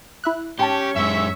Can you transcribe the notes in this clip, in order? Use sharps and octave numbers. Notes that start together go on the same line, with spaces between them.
E4 E5 F#6
G#2 C#4 G4 G5 A5 C#6
F#2 G#3 E5